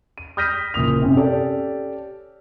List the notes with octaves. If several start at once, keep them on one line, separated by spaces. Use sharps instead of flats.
D#7
D#6 F6 G6 A#6 B6 D#7
F#1 A#2 D#6 F7
F#2 C3
C#4 G4 A4 D5